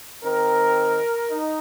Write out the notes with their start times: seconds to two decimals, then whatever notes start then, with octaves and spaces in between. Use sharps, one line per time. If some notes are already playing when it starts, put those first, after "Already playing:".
0.24 D#3 C4 A#4
1.30 D#4